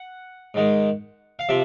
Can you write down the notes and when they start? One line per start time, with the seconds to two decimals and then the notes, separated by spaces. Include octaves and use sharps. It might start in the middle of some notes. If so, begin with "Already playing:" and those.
Already playing: F#5
0.54 G#2 D#3 G#3
1.39 F5
1.49 C3 F3 E5